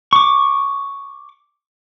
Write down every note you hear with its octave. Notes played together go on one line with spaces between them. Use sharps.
C#6 D6